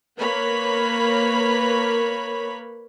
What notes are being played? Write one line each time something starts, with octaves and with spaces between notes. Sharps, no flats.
A#3 A#4 B4 C#5 B5